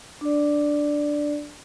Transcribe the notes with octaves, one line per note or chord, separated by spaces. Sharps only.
D4 D5